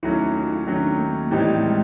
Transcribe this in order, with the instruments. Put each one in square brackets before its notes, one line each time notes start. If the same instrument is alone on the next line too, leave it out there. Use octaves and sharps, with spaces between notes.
[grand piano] D#2 D#3 F#3 A3 C#4 [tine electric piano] E4
[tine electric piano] E4
D#4
F4
E4
[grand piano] D#2 D#3 F#3 A3 C#4 [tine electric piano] D4
[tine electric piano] A#3
[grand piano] A2 E3 G3 C4 D#4 [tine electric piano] A3
[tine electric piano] G#3